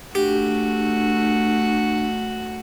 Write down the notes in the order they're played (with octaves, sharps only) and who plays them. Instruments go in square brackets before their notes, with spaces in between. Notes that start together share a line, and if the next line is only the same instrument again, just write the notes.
[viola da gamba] A3 [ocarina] D4 [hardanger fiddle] F#4 [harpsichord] G4